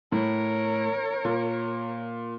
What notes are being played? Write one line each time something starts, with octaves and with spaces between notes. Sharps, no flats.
A2 A#4 C#5
A#2